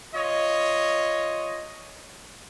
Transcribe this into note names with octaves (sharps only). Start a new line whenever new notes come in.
F4 C#5 D#5